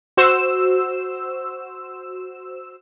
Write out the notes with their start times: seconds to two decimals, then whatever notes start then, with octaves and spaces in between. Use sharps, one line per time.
0.17 F#4 C5 E6